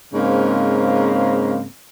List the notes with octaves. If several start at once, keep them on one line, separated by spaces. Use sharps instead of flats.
G#2 C#3 A#3 C4